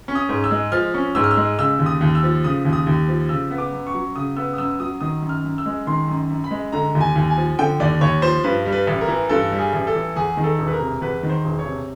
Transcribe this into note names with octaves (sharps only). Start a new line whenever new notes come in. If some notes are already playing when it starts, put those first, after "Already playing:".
C#4
D#6
G#2
E6
G#3
F3 F6
C#4
G#2 E6
F6
E6
G#3
C#3 E6
D#2
D#6
D#2
E6
F3
C#3 D#6
D#2
D#6
D#2
F3
C#3 E6
B3
D6
F#2
C#6
F#3
C#3 D#6
B3 E6
D#6
F#2 E6
F#3 D#6
D#3 D#6
F#2
F6
F#2
E6
G#3
D#3 C6
F#2
F#2
B5
G#3
D3 A#5
D#2
G#5
D#2
G#5
F3
D3 G5
D#2 D5
D#2 C#5
F3 C5
G2 B4
G3
B4
A1
A#4
E3
G2 A4
G3
G#4
A1
A4
E3
E2 G#4
D#3
A4
E1
B4
A#4
C3
E2 B4
D#3
C5
E1
C#5
C3